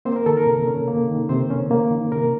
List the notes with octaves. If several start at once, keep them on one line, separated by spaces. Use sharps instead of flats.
A#3 C4 C5
A#4
D#3 A4
A#4
C3
C#4
A#3
D#3
C3 C4 C5
C#4
A#3
D#3
C3 A#4